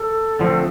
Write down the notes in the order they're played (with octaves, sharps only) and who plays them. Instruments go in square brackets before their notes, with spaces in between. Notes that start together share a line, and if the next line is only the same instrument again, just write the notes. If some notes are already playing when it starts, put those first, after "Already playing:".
Already playing: [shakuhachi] A4
[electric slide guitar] D3 F3 A3 C4